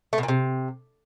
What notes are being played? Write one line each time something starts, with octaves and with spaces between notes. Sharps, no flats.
A3
B2
A#2
C3